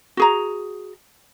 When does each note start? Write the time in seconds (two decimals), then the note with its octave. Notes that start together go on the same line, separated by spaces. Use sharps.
0.17 F#4 G#4 A#5